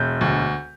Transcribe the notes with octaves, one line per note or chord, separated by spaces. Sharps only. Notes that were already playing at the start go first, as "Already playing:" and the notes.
Already playing: E1 G6
D2